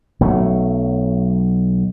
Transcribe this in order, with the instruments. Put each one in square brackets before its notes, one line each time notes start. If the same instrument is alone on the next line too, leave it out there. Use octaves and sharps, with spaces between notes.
[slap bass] B1 F#3 A3